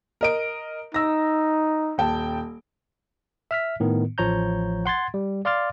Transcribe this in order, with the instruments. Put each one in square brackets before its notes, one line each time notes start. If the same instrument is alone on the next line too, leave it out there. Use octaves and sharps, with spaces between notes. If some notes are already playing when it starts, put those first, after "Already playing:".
[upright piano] A#4 D#5 D7
[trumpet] D#4 [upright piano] E6 A#6
[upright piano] D#1 G5 A5
[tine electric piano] E5 F6 B6
A2 D#3 B3
A1 F3 C#5 A#5 G6
F#5 C6 G#6 A6
G3
D5 F5 C6 D6 F6 A6